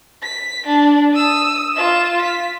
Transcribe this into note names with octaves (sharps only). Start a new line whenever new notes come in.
B6
D4
D#6 E6
F4 E7
B6